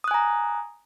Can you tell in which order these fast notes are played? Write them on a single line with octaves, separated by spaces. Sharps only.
D#6 F#6 G#5 A#5